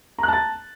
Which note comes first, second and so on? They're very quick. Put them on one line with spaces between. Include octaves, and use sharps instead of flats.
A#5 F#6 A5 A6